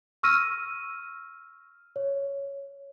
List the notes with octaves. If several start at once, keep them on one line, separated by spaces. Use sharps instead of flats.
C#6 E6 F6 A#6 D#7
C#5